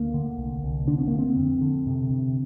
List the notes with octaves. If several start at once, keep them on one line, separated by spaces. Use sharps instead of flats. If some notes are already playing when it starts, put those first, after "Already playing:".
Already playing: D2 A#3
D3
C2
C2
D3 D4
C4
D3 A#3
C4
F2
D3
C3
C3